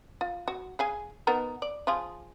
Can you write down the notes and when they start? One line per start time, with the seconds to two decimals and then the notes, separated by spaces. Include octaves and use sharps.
0.21 F4
0.48 F#4
0.79 G#4 F5 G#5
1.27 B3 D#4 A#4
1.62 D5
1.87 F3 F4 G#4